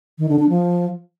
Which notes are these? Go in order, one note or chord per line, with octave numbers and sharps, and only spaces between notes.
D#3
D3
D4
F3